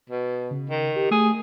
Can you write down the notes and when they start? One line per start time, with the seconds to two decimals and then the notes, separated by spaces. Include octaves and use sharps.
0.09 B2
0.51 C#3
0.70 D#3
0.96 G4
1.11 A3 G#4